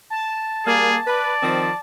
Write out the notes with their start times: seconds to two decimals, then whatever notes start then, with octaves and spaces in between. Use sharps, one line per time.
0.10 A5
0.67 G3 A#3 G#4
1.07 B4 D5
1.43 D#3 F3 C4